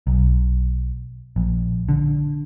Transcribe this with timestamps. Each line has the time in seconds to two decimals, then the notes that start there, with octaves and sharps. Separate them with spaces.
0.07 B1
1.36 A#1
1.89 D3